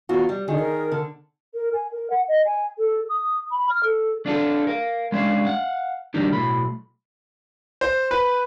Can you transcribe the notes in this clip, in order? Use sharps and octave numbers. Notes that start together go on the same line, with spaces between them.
E2 F4 F#4
G3
D3 D#3 G#4
A#4
D3
A#4
G#5
A#4
F#5
D#5
G#5
A4
D#6
B5
F6
A4
D4 F4 A4
A#4 F5
G#3 C#4 D4 F5
F5 F#5
D#3 G3 A#3 D4 D#4
B1 A2 B5
C5
B4